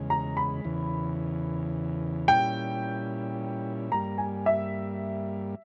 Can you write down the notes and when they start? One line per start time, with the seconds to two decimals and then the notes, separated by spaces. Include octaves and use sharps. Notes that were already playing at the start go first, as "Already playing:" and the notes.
Already playing: E2 C#3 G#3
0.10 A#5
0.37 B5
0.65 E2 C#3 E3
2.28 A#2 G3 C#4 E4 G5
3.92 G2 G3 A#3 A#5
4.18 G#5
4.46 E5